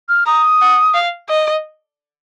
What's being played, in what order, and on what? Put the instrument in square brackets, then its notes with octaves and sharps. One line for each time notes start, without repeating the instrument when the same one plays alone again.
[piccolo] F6
[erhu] A#5 [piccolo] D#6
[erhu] F#5
F5
D#5